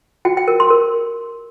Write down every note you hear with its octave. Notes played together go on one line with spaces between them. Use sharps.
F#4 G5
G5
A#4
C6
A#4